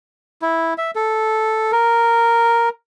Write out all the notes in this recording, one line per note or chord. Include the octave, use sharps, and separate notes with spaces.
E4
E5
A4
A#4